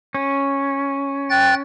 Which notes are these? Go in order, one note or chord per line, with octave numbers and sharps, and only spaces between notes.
C#4
G5 F#6 A6